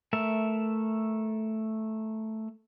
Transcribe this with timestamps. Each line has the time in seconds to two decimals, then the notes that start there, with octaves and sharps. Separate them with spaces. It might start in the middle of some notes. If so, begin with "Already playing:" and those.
0.13 A3 A#4 E5